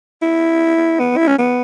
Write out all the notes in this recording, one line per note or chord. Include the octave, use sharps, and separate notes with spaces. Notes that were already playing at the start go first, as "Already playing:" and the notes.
E4
B3
E4
C#4
B3